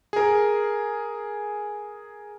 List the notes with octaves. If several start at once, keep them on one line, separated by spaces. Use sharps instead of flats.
G#4 A#4